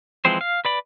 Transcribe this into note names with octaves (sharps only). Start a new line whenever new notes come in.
E3 F3 G#3 C4 C5
F5
B4 D5 B5